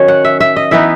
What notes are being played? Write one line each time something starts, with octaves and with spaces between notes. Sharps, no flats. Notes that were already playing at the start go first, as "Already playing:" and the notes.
Already playing: D#3 F#3 C#4 C#5
F#5
E5
E5
D#5
E3 B3 D#4 E5